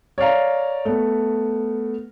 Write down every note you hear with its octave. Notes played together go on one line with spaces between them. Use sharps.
C#5 D5 F5 A#5
A3 B3